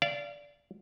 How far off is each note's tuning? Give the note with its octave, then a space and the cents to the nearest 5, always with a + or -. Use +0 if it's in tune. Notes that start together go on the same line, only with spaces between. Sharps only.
D5 -15 F5 -30